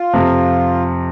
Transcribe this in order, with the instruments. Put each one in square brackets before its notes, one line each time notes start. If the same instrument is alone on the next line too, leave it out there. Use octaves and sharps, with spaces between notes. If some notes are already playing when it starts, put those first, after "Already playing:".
Already playing: [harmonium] F4
[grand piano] F2 C3 F3